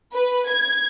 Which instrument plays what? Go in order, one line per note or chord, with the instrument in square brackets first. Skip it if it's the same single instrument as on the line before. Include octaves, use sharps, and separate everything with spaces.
[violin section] B4
G#6